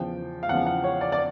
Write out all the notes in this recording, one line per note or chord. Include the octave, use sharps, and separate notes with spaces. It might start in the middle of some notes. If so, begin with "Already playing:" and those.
Already playing: E2 C#3 F3 G5
F5
E2 C#3 F3 F#5
F#5
C#5
D5
D5